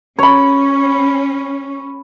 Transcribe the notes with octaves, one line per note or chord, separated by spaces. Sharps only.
C#4 C#5 B5